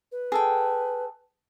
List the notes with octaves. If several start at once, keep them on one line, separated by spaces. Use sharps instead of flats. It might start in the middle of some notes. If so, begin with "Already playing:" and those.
B4
G#4 A4 G5